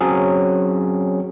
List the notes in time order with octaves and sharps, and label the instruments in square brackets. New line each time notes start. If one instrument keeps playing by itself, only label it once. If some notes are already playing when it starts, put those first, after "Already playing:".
[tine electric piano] F#3 C4 C#4 G#4